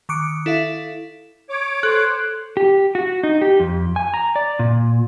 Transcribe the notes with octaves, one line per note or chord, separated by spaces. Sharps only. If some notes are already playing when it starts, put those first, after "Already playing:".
D#3 C#6 D6 F#6 C#7 D7
E4 A4 E5 F5
C#5 D6
A4 C5 F#6
G4
F#4
D#4
G4
F2
G#5
A#5
D5
A#2